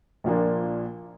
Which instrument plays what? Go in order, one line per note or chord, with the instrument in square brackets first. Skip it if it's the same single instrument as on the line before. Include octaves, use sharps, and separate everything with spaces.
[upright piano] A#1 A#2 F3 A#3 D4